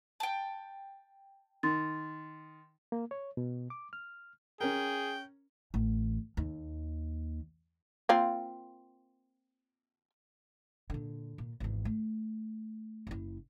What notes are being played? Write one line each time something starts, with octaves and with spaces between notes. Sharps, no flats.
G5 A5
D#3 C6 A6
A#3
C#5
B2
D6
F6
C#4 G#4 A#4 G5
A1
D#2
A#3 C4 F4
A#2 D3
A#2
G#1 E2
A3
F#1 E4